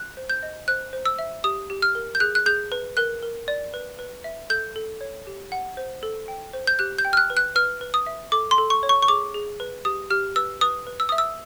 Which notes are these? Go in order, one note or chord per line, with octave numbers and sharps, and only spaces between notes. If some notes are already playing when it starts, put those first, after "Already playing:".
Already playing: F#6
C5
G6
D#5
C5 F#6
C5
E6
E5
G4 D#6
G4
F6
A#4
G6
G#4 F#6
F#6
G#4 G6
B4
A#4 F#6
A#4
D5
B4
B4
E5
A4 G6
A4
C#5
G4
F#5
C5
A4
G5
C5
G6
G4 F#6
G6
G5
F6
F#6
B4
F#6
B4 F6
B4
D#6
E5
A4 D6
C6
A4
C#6
C#5
C#6
C#6
G#4 D6
G#4
B4
G4 D#6
G4 F6
B4 E6
B4 D#6
B4
E6
E5 D#6
E6